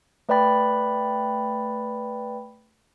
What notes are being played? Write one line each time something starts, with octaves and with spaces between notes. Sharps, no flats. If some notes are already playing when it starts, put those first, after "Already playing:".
A3 B4 D5 G5 B5 A6